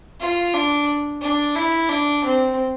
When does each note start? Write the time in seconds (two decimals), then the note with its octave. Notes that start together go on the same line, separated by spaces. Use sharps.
0.20 F4
0.54 D4
1.22 D4
1.56 E4
1.89 D4
2.24 C4